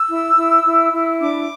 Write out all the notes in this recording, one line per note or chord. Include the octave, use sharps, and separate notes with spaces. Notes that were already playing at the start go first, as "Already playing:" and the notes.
Already playing: E6
E4
E4
E4
E4
D4 D6